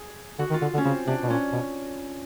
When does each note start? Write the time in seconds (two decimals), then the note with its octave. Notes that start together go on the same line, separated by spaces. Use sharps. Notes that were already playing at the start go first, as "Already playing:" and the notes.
Already playing: G#4
0.39 D3 F#4
0.50 D#3
0.54 F4
0.62 D3
0.74 D3
0.78 C#4
0.84 C#3 C4
1.07 C3 D4
1.23 B2
1.29 A#2 C#4
1.52 B2